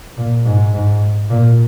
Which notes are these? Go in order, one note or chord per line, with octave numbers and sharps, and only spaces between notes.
A#2
G#2
G#2
A#2